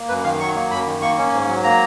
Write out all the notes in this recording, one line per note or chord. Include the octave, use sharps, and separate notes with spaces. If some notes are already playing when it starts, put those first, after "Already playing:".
Already playing: A#3
F#2 B4
D#3 F5
F#3 C#6
A#3
F#2 B5
D#3
A#3 C#6
C#4
G#2
F#3
A#3 A#5